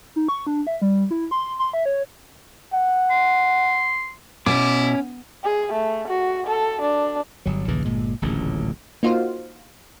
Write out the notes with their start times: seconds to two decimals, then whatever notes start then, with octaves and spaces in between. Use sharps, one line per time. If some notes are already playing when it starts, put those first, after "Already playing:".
0.16 D#4
0.29 C#6
0.47 D4
0.67 E5
0.82 G3
1.11 E4
1.31 C6
1.59 C6
1.73 E5
1.86 C#5
2.73 F#5
3.11 C6
4.46 B2 C#4 E4 D6
5.44 G#4
5.73 A3
6.08 F#4
6.47 A4
6.81 D4
7.46 G1 F#3
7.68 A#1 D#2 C#3 E3
7.85 G1 A#2 G#3
8.22 D1 A1 A#2 C#3
9.03 A#3 D#4 F4 F#4 C5 F5